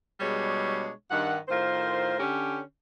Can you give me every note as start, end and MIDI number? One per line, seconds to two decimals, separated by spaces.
0.20 0.90 47
0.20 0.90 55
0.20 0.90 56
0.20 0.90 62
0.20 0.90 68
0.20 0.90 73
1.11 1.36 43
1.11 1.36 51
1.11 1.36 78
1.49 2.15 45
1.49 2.15 51
1.49 2.15 65
1.49 2.15 70
1.49 2.15 72
2.19 2.59 50
2.19 2.59 61
2.19 2.59 67